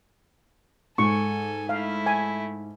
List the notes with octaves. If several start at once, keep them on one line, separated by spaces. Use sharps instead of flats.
G#2 A4 G#5 C#6
A3 E4 F5
G#5